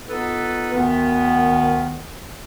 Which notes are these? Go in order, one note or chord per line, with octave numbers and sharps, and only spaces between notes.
B3 D#4 F4 A4 B4
D2 D#3 B3